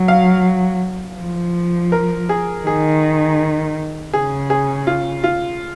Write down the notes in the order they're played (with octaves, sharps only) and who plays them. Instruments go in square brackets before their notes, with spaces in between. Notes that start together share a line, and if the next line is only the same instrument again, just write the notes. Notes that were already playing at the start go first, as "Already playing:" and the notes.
Already playing: [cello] F#3
[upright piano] F5
[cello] F3
[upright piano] A#4
G#4
[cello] D#3 [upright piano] G#4
[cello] C#3 [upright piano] G#4
[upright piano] G#4
F4
F4